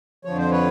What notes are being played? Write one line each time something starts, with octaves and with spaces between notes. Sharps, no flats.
F2 D3 F3 C#5
C5
B4 C#5